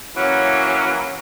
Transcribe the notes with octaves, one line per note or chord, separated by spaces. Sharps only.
E3 F#3 A#3 C#4